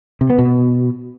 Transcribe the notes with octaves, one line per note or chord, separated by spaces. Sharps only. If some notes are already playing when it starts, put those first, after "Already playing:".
C3
B3
B2